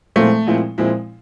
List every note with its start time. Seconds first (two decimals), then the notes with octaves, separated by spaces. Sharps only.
0.16 A#2 F3 G#3 A3 C4 E4
0.47 A#2 F3 G#3 C4 E4
0.78 A#2 F3 G#3 C4 E4